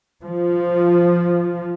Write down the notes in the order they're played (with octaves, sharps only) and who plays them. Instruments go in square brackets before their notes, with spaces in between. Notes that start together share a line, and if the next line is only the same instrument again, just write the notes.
[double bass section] F3